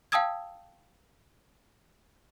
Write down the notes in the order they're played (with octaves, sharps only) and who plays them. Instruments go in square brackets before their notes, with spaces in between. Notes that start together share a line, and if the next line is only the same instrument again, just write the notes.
[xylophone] F5 G5 A5 D#6 E6 G#6